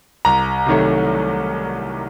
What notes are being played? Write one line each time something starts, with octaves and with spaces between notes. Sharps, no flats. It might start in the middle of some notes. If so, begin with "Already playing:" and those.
C2 A#5
C3 D#3 F#3 A3